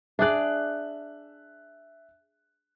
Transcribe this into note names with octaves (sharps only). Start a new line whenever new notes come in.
D4 G#4 D5 E5 F#6